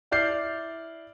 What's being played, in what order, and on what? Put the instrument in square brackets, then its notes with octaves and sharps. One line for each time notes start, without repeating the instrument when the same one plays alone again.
[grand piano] E4 D5 F6 G6 C7